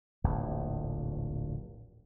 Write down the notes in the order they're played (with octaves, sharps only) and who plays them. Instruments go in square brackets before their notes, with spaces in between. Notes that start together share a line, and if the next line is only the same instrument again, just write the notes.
[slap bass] D1 A#1 E2